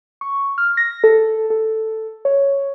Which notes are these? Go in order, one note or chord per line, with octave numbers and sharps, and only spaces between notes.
C#6
F6
A#6
A4
A4
C#5